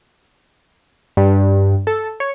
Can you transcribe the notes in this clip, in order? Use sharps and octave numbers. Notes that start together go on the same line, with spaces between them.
G2
A4
C#5